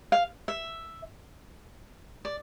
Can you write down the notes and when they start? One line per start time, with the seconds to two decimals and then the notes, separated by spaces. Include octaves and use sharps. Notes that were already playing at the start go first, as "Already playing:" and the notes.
0.12 F5
0.48 E5
2.25 D5